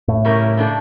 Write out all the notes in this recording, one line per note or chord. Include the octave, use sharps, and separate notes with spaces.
A2
C#3 G3 C#4 E4 A#4
C#3 G3 D4 A4